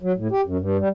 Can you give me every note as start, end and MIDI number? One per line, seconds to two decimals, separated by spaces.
0.02 0.12 54
0.16 0.28 45
0.31 0.41 67
0.45 0.57 42
0.60 0.77 43
0.79 0.88 55